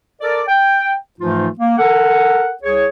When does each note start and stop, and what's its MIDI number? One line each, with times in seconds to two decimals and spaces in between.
0.21 0.42 69
0.21 0.42 70
0.21 0.42 74
0.48 0.94 79
1.20 1.47 44
1.20 1.47 52
1.20 1.47 53
1.20 1.47 57
1.20 1.47 63
1.20 1.47 65
1.59 1.77 58
1.78 2.51 69
1.78 2.51 70
1.78 2.51 78
2.63 2.87 36
2.63 2.87 68
2.63 2.87 73